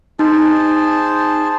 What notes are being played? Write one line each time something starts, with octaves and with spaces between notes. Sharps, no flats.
D#4 G#4 C5 A5